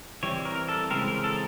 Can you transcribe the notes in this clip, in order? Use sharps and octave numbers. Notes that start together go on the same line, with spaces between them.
E3 G3 C4 C#5
A#4
A4
C#3 E3 G#3 C4 A#4
A#4
A4